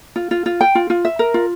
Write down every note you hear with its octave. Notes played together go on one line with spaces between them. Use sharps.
F4
F4
F4
G5
F4
F4
E5
A#4
F4